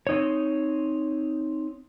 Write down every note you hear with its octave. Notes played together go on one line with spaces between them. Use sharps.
C4 D#4 C#5